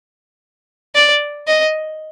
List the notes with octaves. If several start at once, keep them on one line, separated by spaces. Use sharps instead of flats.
D5
D#5